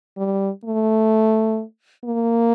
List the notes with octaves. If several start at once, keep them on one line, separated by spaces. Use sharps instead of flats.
G3
A3
A#3